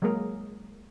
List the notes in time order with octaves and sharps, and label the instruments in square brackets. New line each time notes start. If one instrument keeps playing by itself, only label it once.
[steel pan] F#3 G#3 A#3 G#4 A#4